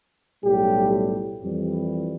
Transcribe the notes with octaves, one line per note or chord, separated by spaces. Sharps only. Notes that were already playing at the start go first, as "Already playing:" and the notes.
B1 A2 G3 G4
F2 E3 G3